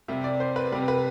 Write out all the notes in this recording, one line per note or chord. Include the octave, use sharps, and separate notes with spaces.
C3 G3 E5
D5
C5
B4
C3 G3 B4
B4